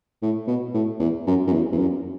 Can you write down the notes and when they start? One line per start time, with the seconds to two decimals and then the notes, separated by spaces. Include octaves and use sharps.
0.22 A2
0.47 B2
0.74 A2
1.00 E2
1.27 F#2
1.47 F#2
1.53 E2
1.72 E2
1.79 F#2